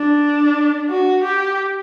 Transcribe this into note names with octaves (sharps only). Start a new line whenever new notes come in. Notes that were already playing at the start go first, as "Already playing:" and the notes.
Already playing: D4
F#4
G4